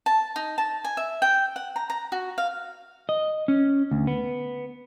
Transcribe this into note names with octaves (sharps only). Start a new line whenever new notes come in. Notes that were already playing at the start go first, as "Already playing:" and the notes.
A5
D#4
A5
G#5
E5
G5
F#5
A#5
A#5
F#4
F5
D#5
C#4
D2
B3